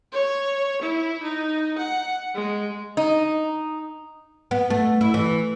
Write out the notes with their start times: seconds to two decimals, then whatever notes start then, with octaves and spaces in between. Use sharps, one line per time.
0.12 C#5
0.81 E4
1.22 D#4
1.77 F#5
2.35 G#3
2.97 D#4
4.51 B3
4.70 A3
5.01 E4
5.14 E3